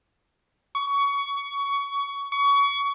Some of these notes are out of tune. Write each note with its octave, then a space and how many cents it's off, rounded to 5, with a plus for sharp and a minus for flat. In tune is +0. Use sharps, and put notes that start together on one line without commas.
C#6 +20
C#6 +25